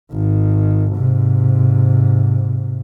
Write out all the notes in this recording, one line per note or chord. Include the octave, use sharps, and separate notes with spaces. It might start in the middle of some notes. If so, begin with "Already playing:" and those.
G#1 D#3
G#2 C3